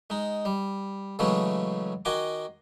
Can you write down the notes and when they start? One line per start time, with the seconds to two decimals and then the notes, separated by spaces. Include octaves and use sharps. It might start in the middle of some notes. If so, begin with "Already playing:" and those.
0.10 G#3 D#4
0.45 G3
1.19 C#3 E3 F#3 G#3 A3 C#4
2.05 D#3 F#4 D#5 G#5 C6 D6